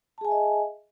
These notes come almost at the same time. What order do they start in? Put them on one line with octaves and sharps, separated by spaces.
A5 G#4 G#5 E5 D#5